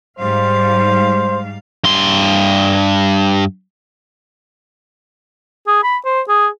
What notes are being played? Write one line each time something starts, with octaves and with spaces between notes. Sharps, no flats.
G#2 G3 C5 F5
G2 C6
G#4
B5
C5
G#4